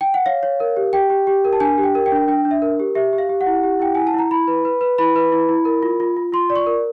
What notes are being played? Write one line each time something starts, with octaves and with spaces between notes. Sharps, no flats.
G5
F#5
C#5 F5
C#5
A#4
G4
G4 G5
G4
G4
A#4
A5
D4 G#5
G4
G5
A#4
G5
D4
D4 G5
D4
E5
A#4
G4
G4 E5
G4
F5
G4
F#5
E4
G4
E4 G5
E4 G#5
A5
E4 A#5
E4 B5
B4
B4
B4
E4 B5
B4
E4
E4
A#4
F4
F4
F4
F4 C6
D5
C#6
A#4